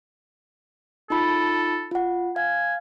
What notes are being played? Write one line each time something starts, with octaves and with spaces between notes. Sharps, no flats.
D#4 F4 A4 B5
F4 F#5
F5 G#5